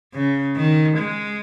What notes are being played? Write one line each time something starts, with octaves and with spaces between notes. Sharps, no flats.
C#3
D#3
G#3